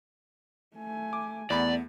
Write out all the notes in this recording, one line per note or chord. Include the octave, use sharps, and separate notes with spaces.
A3 G#5
D6
E2 A3 B3 D5 B5